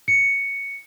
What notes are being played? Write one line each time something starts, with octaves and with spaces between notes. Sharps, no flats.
C#7